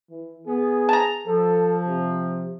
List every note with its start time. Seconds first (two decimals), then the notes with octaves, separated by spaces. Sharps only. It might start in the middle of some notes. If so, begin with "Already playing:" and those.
0.10 E3
0.46 B3 G#4
0.89 A5 A#5
1.27 F3 A4
1.87 C3